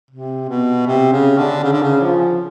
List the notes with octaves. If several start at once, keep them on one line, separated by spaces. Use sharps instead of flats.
C3
B2
C3
C#3
D3
C#3
D3
C#3
F3